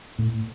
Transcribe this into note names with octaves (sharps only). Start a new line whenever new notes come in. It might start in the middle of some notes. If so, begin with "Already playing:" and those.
A2